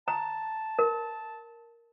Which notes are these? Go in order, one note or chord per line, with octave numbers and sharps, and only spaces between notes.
A5 A#5
A#4